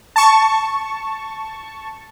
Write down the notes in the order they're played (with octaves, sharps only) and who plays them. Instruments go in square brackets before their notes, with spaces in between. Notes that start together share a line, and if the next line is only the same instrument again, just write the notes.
[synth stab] A5 C#6